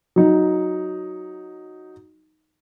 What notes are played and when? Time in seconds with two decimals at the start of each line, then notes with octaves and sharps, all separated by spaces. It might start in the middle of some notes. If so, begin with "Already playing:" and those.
0.16 F#3 D#4